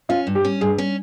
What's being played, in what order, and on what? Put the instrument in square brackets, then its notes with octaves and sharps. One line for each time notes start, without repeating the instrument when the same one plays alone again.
[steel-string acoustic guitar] C#4 [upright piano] F4
[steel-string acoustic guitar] G2
[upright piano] G4
[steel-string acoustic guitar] C#4
[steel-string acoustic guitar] G2 [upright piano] G#4
[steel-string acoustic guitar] C#4